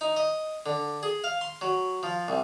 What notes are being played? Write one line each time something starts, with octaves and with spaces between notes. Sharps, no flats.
D#4
D#5
D3
G#4
F5
C6
F#3
F3
C2